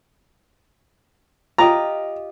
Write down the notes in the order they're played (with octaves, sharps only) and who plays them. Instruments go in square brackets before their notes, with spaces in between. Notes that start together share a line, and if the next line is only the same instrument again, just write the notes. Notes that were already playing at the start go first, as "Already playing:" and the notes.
[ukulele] F4 G4 D#5 [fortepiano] A#5